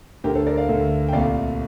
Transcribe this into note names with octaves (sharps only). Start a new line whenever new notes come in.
D2 D3 A3 G4 A#4
A4 C5
A#4 D5
D5 F5
D2 D3 A3
G5
C2 A#2 A3 D5 F5